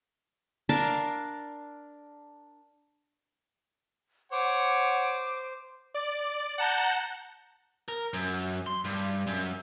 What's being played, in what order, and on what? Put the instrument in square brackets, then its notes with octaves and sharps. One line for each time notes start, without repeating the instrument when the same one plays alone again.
[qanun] D4 A#4 F5 A5
[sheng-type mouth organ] C5 [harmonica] C#5 F#5 [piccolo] D6
[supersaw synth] D5
F#5 A5 A#5 G6
[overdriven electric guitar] A#4
F#2
C6
G2
F#2